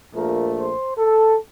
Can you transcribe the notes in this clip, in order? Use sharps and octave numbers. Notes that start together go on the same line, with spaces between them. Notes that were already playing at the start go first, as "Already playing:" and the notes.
A#1 A#2 F3 A3 A#4
C5
A4